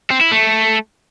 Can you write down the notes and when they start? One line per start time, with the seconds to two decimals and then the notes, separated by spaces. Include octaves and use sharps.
0.10 C4
0.21 E4
0.32 A3